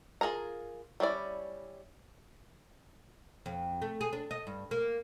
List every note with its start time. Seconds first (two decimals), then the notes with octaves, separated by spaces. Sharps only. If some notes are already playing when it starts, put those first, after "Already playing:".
0.21 F4 G#4 A#4 A#5
1.00 G3 C#4 E4 D5
3.46 F2
3.82 A3
4.01 G#4
4.13 D4
4.31 D#5
4.47 G2
4.71 A#3